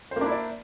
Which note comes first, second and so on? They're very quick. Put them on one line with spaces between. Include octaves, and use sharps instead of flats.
C5 A#3 D4 E4 D5